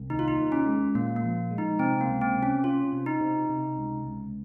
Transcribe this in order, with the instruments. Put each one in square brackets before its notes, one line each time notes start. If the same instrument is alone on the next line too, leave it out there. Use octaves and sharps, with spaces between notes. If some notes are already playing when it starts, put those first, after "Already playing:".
Already playing: [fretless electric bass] C2
[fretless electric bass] D#2 [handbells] D#4
[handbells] F4
D#4
[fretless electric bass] D#3
[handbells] C#4
[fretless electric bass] G#3
[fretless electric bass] A#2 [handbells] A#3
[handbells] A#3
[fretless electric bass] F3
G#3
[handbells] D#4
[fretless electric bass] C3 [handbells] C4
[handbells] A#3
[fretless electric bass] C#2
[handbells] C4
[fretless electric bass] C3
[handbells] C#4
[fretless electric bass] C#4 [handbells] F4
[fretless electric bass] C3
[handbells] D#4
[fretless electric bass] C3
C3
C#2
C#2